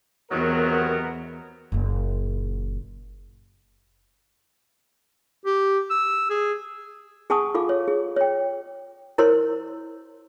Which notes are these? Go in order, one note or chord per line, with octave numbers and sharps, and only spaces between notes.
E2 C3 D#3 F#3 B3 A#4
F#1 A#2
G4
E6
G#4
G#4 F#5 G#5 A5 C#6 D#6
F4 A4 F5 D6
C#5
G#4
C#5 G5
E4 A#4 C5 C#5 C6